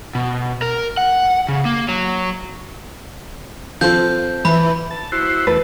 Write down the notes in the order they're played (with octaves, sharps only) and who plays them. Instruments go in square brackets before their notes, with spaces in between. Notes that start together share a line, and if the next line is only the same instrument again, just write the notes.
[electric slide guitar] B2
A#4
F#5
C#3
A#3
F#3
[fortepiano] F3 [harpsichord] C4 A4 F5 [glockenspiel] G6
[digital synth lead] E3 [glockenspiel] B5
[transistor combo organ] A5
E4 F#4 C5
[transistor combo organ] E2 A3 A5 [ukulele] B4